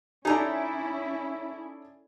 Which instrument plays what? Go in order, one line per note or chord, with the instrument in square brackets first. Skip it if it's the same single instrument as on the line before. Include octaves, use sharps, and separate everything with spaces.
[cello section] C#4 E4 [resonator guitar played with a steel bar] D#4 A#5 [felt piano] G#4 A4 D5